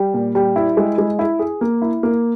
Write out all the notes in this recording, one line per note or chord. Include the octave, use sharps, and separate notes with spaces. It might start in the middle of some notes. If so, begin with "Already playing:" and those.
Already playing: G3
A#2
G3
E4
G#3
G#3
E4
G#4
A#3
E4
A#3